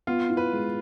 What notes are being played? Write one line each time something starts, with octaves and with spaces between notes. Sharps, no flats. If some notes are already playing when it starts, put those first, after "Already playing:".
B3 F4
E4
B4
G#3